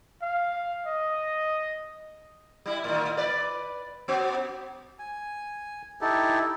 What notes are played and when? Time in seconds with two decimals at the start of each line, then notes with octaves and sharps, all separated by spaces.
0.22 F5
0.86 D#5
2.66 G3 E4
2.84 A2 D#3
3.17 B4 D5
4.08 B3 F#4
4.99 G#5
6.01 D#4 E4 G4 A4